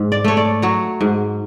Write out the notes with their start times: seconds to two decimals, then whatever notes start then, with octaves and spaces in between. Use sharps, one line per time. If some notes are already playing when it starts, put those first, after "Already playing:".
Already playing: G#2
0.12 D5
0.24 A3 C#5
0.37 D5
0.62 F#3 C#5
1.01 G#2